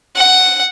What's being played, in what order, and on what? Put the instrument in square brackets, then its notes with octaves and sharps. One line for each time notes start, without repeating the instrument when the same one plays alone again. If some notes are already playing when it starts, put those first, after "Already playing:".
[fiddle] F#5